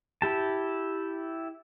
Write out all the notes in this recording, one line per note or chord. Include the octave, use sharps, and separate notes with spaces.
E4 G4 A5